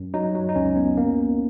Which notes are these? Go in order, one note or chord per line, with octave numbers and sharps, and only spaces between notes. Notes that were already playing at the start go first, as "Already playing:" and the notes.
Already playing: F#2
F#3 D#4
F#3
D#4
C#2 C#4
B3
A#3